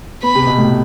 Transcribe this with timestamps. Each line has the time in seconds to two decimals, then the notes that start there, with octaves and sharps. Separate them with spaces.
0.22 B3 B5
0.35 C3
0.47 B2
0.58 A2